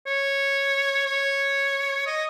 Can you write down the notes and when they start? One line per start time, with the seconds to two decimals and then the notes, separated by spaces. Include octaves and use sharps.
0.07 C#5
1.06 C#5
2.07 D#5